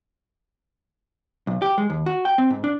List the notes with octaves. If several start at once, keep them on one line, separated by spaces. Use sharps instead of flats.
B1
G4
G#3
D#2
F#4
G5
C4
G#2
D4